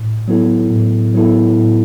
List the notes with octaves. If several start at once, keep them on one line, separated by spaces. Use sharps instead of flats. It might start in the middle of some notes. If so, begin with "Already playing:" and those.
Already playing: A2
F#3 B3 E4 A4
A2
F#3 B3 E4 A4
A2